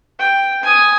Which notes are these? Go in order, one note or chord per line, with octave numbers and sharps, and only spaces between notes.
G5
G#5 D#6